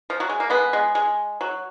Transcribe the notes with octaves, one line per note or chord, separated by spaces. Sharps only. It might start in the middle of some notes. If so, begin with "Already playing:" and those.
F3
F#3
G#3
A#3
G#3 B3
G#3
G#3
F#3